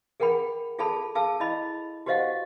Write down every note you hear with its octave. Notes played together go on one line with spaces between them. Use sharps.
G#4 A#4 F#5 G5 B5
F4 G#4 A4 A5 B5
G#4 F5 A5 E6
E4 D#5 B5
F#4 G4 C5 D#5 F5 F#5